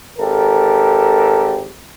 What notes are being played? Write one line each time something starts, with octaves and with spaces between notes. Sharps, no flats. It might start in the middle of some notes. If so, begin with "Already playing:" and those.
G#1 G4 A4 A#4